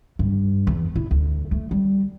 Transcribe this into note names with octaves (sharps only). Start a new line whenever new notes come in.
G2
E2
E4
D2
A3
G3